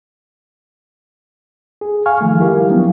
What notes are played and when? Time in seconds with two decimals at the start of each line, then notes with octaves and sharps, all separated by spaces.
1.81 G#4
2.06 F5 G#5 C#6 F6
2.21 D#3 F3 A3
2.39 G3 E4 G4 A#4 F5
2.70 F3 F#3 B3 D4